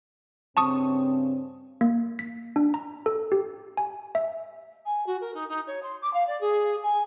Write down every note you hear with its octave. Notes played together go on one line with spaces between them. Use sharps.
G2 C#3 C4 A5 C#6 D#6
A#3
B6
D4
A#5
A4
G4
G#5
E5
G#5
F#4
A#4
D#4
D#4
C#5
C6
D6
F5
D5
G#4
G#5